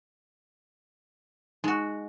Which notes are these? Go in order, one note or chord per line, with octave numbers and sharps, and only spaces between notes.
G#3 D#4 F#4